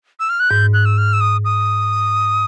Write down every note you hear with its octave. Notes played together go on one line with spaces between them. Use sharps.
E6
F6
F#6
G#2 G6
F#6
E6
F6
E6
D#6
D#6